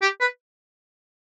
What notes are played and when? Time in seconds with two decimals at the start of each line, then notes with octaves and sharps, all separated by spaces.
0.02 G4
0.21 B4